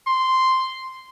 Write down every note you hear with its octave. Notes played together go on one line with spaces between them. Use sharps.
C6